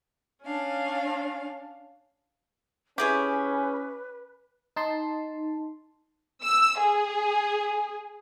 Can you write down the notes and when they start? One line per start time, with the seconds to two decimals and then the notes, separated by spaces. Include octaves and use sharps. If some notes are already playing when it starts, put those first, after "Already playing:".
0.42 C#4 D4 F5
2.98 C#4 E4 G4 G#4 B4 C#5
4.76 D#4 A5 C6
6.43 E6
6.80 G#4